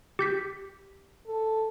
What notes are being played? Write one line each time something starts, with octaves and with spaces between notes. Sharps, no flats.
G4 G6 B6
A4